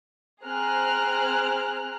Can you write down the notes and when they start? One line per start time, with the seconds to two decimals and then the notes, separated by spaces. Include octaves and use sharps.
0.43 C4 G#4 A#5 F6 F#6